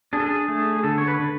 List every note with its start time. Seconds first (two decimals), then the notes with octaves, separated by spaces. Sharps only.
0.13 D4 G#4
0.20 A4
0.26 G#4
0.48 A3 G#4
0.76 G#4
0.83 D3 A4
0.98 C#5
1.08 B4
1.19 D3